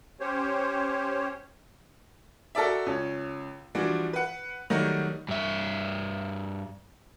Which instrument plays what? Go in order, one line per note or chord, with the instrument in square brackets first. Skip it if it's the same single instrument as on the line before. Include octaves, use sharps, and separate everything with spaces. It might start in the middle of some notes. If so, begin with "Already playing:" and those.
[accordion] C#4 G4 C5 C#5
[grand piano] F#4 A4 A#4 D5 E5
C#2 C#4
E3 F3 G3 D4 F#4
B4 F#5
D#3 F#3 G3 A3 D#4 F#4
[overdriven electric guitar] G2 E5